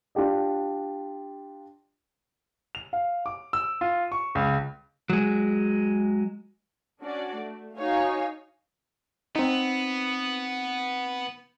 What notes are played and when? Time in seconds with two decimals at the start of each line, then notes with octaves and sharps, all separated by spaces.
0.15 D4 F4 G4 D#5
2.75 F7
2.93 F5
3.26 D6
3.53 E6
3.81 F4
4.12 C#6
4.35 C#2
5.10 F#3 G#3
7.01 C#4 D4 F#4 D5
7.37 A3
7.76 D#4 F#4 C#5 F5 G#5
9.36 B3 C4 D#4